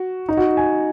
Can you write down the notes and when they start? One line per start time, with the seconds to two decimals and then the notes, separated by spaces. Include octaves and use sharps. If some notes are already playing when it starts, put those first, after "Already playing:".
Already playing: F#4
0.29 D#4
0.37 F#4
0.57 G#5